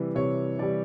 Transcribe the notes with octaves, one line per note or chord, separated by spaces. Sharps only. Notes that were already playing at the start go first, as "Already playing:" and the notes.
Already playing: C3 E3 G3
C3 C#5
E3 G3 D5